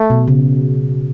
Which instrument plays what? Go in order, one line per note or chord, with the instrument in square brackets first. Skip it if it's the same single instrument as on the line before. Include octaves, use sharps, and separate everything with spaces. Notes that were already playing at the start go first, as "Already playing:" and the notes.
Already playing: [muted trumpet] A3
[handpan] B2
C#3